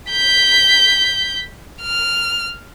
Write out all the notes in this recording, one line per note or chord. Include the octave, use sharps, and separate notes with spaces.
G6 B6
F6